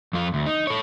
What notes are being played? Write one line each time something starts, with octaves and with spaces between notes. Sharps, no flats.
F2 F4
D2
D#4
A4 C#5